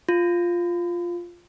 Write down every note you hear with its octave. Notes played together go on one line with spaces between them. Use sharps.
F4